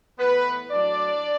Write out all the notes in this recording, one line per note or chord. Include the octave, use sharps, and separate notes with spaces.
A2 E3 B3 B4
A2 F#3 D4 D5